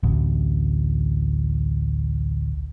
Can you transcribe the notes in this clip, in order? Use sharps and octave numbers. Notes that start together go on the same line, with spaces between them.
A1 D2